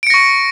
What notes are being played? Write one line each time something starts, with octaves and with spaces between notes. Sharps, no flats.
C#6 A#6 C#7 D7